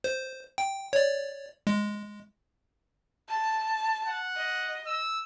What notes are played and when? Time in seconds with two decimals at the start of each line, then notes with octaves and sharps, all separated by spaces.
0.04 C5
0.58 G5
0.93 C#5 D5
1.67 G#3
3.29 A5
4.06 F#5
4.36 D#5
4.87 E6